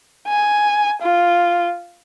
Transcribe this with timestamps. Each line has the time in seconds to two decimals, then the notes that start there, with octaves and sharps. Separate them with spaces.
0.28 G#5
1.02 F4